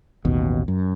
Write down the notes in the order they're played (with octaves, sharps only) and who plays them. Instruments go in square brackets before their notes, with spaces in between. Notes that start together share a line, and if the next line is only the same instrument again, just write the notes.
[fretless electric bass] A1 D#2 B2
F#2